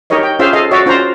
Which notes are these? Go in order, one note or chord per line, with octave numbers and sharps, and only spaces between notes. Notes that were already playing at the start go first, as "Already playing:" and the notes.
D#4 G4 A#4 C#5 D#5
G5
C#4 F4 G#4 C5 E5 F5
G#4 A4 D#5 F5
F#4 C#5 D5 E5
C#4 F4 C5 D5 A#5